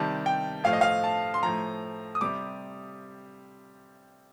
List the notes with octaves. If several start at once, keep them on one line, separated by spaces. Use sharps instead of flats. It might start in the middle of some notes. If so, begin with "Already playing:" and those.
Already playing: C3 D#3 G3 A5
G5
A2 F3 F5
D#5
F5
A5
C6
A2 F3 A#5
D#6
C3 G3 D6